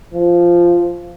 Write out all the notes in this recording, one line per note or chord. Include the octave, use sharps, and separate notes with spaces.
F3